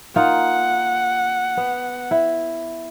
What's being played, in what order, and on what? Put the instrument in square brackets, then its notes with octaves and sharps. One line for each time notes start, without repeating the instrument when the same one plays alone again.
[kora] A#3 D#4 F4 [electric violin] F#5
[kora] B3
E4